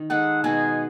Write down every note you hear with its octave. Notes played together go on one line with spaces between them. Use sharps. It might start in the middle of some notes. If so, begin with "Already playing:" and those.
Already playing: D#3
G#3 D#4 A4 F#5
B2 G#3 D#4 F#4 G#5